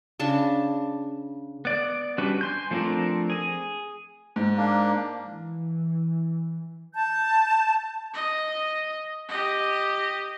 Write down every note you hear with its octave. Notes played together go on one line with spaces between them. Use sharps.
C#3 D4 A5
B3 D5
G3 C#4 D4 F#4 B4
G#5 C6 G6
F3 A3 C4 D4 A#4
G#4 G#5
G#2
A#3 D4
E3
A5 G6
D#5
G4 D#5